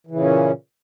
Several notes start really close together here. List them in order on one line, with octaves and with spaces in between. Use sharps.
E3 C#3 A#2 C#4